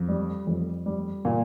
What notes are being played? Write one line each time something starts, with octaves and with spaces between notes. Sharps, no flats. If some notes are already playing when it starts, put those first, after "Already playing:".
Already playing: F2
G3
F2
G3
A#2